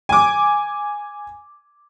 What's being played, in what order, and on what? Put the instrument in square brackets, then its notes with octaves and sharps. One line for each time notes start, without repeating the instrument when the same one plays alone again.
[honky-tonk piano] G#5 D6